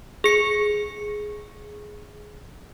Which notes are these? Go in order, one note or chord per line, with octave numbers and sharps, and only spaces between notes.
G#4 C#7